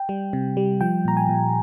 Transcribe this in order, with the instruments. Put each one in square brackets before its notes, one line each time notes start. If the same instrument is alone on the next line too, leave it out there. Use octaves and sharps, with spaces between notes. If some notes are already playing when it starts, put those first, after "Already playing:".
Already playing: [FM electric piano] G5
G3
C3
G3
F3 G5
A#2 A#5
G#5
A#2